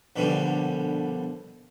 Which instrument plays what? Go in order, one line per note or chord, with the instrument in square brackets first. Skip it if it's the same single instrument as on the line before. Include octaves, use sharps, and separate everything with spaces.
[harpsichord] A#1 B2 D3 G3